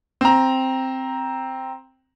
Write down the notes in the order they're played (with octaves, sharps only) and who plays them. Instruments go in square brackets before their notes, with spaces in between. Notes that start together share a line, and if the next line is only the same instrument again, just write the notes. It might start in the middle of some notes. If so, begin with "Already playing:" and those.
[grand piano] C4 A#5